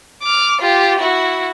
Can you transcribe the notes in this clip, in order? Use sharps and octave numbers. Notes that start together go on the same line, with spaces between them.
D6 F6
F4 G4
E4 F#4